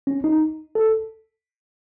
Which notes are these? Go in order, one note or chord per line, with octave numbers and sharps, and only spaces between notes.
C#4
D#4
A4